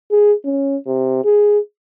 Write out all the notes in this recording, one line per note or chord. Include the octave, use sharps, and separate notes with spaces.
G#4
C#4
C3
G#4